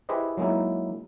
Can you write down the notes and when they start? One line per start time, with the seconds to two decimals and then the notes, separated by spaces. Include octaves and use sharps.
0.09 E4 G4 G#4 B4 C5 D#5
0.37 F#3 G#3 A#3 D#4 E4